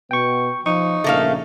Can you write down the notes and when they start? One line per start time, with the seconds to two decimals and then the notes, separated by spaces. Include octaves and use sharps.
0.11 B2 B3 G5 C#6
0.66 F3 D#4 C#6
1.04 A#1 G#2 C#3 A3 A#3 F5